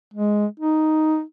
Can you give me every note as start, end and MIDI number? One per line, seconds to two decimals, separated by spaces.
0.14 0.46 56
0.60 1.21 63